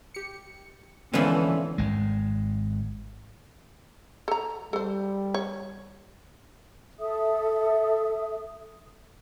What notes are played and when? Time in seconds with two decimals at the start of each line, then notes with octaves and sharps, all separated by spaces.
0.14 G4 C#7
1.14 D3 E3 F3 G#3 A#3 B3 C#4 B4
1.78 G#1 G#3
4.28 A4 A#5
4.73 G3 A4 C5
5.34 C#5
6.99 A4 E5 D#6